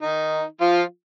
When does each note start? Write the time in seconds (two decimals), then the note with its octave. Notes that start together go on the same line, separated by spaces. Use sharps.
0.02 D#3 D#4
0.61 F3 F4